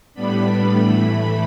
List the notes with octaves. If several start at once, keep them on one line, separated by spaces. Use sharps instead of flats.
A2 G3 B3 D4 B5
A2 E3 A3